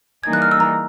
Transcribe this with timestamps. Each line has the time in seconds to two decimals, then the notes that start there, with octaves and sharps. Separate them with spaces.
0.24 E3 G3 A#3 D#4 G#4 G#6
0.33 F#6
0.42 F6
0.51 E6
0.60 A#5